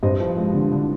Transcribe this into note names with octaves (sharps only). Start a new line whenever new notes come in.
G2 C5 D#5
F3
G#3
D3
D3